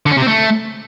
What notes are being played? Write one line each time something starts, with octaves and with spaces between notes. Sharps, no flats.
D3
C#4
C3
C4
A3